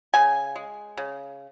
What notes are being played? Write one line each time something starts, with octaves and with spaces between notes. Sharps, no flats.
C#3 G#5
G#3
C#3